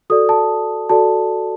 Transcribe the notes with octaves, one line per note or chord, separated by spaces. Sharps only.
F#4 A4 D5 D#6
A5
F#4 A4 D5 A5